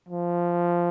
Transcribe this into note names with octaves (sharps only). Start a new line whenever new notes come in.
F3